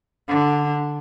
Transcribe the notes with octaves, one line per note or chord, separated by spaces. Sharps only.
D3